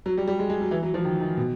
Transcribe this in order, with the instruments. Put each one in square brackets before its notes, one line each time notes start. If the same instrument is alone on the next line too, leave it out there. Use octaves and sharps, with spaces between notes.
[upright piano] F#3
G3
G3
G#3
G#3
F#3
E3
F#3
F3
D#3
D#3
B2